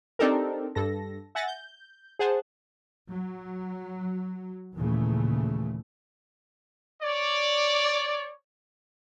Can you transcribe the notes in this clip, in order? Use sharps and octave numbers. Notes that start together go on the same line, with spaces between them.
C4 D4 D#4 G4 A4 A#4
G2 A4 A#6
E5 F#5 G#5 A6 A#6
G6
G#4 C5 F#5 A5
F#3
D#2 A#2 C#3 E3 A3
C#5 D5